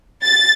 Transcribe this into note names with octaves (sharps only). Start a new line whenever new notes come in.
A6